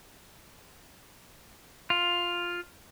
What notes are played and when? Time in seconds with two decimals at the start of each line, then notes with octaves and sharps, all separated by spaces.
1.90 F4